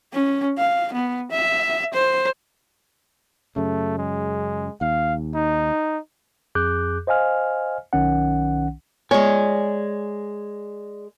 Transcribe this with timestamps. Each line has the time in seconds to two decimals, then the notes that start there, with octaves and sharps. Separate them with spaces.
0.13 C#4
0.58 F5
0.93 B3
1.32 E5
1.93 C5
3.56 F#2 C#3 A3
3.98 G#3
4.81 D#2 F5
5.35 D#4
6.55 F2 G#4 D6 F#6 G6
7.07 C5 D#5 F5 G#5 F6
7.93 B1 D#3 C#4 F#5
9.11 G#3 C#5 D5 G#5